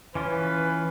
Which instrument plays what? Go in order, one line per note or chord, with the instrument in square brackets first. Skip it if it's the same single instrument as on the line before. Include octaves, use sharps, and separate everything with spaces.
[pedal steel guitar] E3 C#4 F4 [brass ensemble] B4